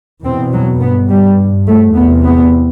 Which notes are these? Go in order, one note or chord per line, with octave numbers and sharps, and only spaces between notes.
E2 B2 C4
F#3
G2 B3
G3
G2
A3
E2 B3
C3
B3